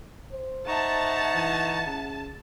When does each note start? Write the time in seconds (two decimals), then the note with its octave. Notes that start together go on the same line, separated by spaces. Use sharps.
0.32 C5
0.68 D#4 E5 F#5 A5 A#5 C#6
1.33 E3
1.86 C#3